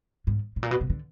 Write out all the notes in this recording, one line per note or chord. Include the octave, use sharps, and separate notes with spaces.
G#2
A2
A#2
B2
C3
D3